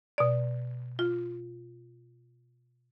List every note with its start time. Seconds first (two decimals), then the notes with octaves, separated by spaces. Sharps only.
0.18 B2 D5
0.99 F4